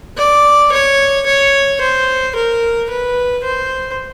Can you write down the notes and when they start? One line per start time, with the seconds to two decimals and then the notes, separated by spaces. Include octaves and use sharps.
0.17 D5
0.72 C#5
1.26 C#5
1.81 C5
2.35 A#4
2.89 B4
3.44 C5